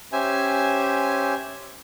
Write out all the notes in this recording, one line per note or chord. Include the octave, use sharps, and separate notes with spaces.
C#4 G4 C5 E5 G#5